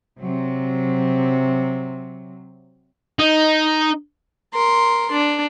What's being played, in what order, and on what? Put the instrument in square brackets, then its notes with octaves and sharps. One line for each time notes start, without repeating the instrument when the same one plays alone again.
[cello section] C3 F#3
[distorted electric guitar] D#4
[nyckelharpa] A#4 C6
D4